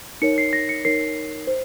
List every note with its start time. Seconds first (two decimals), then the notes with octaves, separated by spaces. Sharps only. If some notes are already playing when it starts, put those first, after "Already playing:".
0.22 D#4 A#4 C#5 C#7
0.38 C7
0.53 A#6
0.69 C#7
0.85 D#4 A#4 C#5 C7
1.47 C5